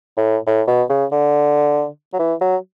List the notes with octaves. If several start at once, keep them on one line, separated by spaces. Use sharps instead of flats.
A2
A2
B2
C#3
D3
F#3
E3
F#3